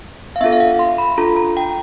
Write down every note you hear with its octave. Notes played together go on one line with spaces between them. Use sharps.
F5
B3 D4 F4 A4 E5
F5
F#5
C6
B5
D4 F4 A4 A#5
A#5
G5